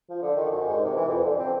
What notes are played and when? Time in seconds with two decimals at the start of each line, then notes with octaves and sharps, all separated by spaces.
0.09 F3
0.22 D3
0.36 D#3
0.51 F#2
0.68 G#2
0.85 C3
0.96 E3
1.09 F2
1.23 D3
1.39 C4